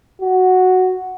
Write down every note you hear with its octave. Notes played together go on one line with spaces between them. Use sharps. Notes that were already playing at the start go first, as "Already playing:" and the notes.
F#4